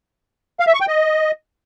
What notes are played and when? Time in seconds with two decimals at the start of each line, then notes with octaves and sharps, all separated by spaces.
0.60 F5
0.67 E5
0.74 C#6
0.81 G5
0.88 D#5